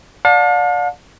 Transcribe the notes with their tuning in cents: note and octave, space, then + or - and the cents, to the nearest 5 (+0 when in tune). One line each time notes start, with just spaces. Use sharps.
D5 +0 F5 +45 A5 +0